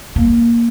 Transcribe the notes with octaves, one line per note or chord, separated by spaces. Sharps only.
A#3